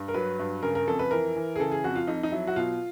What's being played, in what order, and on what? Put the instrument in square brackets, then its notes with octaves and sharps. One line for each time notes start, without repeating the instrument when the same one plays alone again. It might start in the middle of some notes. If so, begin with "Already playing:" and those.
Already playing: [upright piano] G2
A#4
F#3 B4
G2
C#3 A#4
A#4
F2 A4
B4
E3 A#4
E3
G#4
C#3 A4
G#4
F2 F#4
F4
F2 D#4
D#4
F#3 E4
F#4
B2 F4